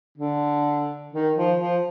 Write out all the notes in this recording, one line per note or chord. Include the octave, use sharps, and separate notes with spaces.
D3
D#3
F3
F3